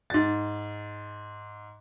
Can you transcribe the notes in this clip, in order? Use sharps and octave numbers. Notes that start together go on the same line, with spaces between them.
G#2 A6